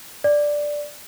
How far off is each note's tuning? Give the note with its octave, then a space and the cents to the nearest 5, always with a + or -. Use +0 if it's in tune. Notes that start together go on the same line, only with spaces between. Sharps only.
D5 +0